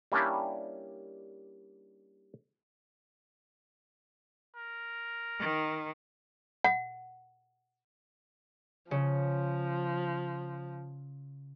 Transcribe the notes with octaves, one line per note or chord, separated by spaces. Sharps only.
G3 A#3 C#4 D4 E4 G4
A#4
D#3
F#5
C#3 F3